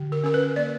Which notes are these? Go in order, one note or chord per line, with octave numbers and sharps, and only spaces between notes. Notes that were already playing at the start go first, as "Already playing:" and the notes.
Already playing: D3
A#4
C#4 A#4
B4
A#3 D5